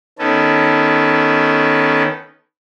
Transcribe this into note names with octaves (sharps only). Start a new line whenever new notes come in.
D#3 B3 C#4 A4